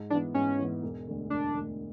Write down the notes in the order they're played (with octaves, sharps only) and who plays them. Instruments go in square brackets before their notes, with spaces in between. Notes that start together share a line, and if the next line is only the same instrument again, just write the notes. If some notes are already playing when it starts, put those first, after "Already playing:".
Already playing: [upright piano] G#2
[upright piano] E3 B3 [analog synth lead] D4
[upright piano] G#2 [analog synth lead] C#4
[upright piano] E3 B3
E1
D2 D3
[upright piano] E1 [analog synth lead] D4
[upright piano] D2 D3